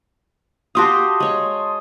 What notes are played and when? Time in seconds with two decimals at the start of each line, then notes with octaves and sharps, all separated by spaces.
0.75 F#4 G4 F5 A5 C6 D#6
1.20 G#3 C#5